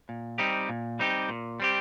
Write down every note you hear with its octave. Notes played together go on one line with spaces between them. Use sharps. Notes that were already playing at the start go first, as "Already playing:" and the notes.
A#2
G3 C4 D#4 G4
A#2
G3 C4 D#4 G4
A#2
G3 C4 G4